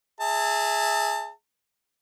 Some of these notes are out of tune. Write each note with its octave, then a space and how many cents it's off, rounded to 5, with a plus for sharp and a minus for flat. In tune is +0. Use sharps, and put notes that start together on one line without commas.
G#4 +0 E5 -15 A5 +30